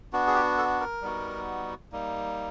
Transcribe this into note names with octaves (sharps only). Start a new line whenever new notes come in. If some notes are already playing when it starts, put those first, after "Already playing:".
B3 D4 F#4
G#4
G4
A4
A#4
G3 B3 D#4 F#4
G3 A#3 D#4